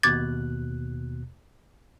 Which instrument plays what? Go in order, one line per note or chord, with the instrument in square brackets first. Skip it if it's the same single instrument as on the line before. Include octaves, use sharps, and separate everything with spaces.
[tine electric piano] D#2 B2 F#6 [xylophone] D6 G#6 A6